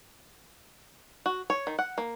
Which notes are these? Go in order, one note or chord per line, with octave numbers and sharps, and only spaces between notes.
F#4
C#5
D#3
F#5
A#3